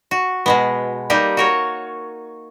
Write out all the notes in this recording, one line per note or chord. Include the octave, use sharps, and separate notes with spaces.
F#4
B2 G#3 B3
G3 A#3 D#4 G4
F#4 A#4 C#5